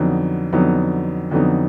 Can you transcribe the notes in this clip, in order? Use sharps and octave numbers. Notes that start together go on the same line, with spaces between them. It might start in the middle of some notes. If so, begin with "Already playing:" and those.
Already playing: F2 D3 F#3 B3 D#4
F2 D3 F#3 B3 D#4
F2 D3 F#3 B3 D#4